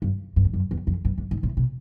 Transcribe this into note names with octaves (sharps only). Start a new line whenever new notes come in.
G2
G2
F2
F#2
E2
F2
G2
G2
G#2
A2
B2